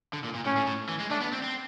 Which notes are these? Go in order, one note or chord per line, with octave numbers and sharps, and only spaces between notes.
D3
A#2
A#2
A2 C#4
A2
A2
E3
G#3
A3 D4
B3
C4
C4